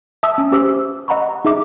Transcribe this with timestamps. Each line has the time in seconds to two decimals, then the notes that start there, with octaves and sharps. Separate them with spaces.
0.23 E5 A5 D#6 E6
0.38 C#4
0.52 C#4 G4 C5 E6
1.08 D#5 F#5 A#5 B5 C#6
1.45 D#4 G#4 E5 D6